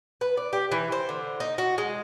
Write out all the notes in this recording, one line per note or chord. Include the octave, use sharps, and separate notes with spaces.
B4
D5
G4
E3
C5
D3
D#4
F#4
G#3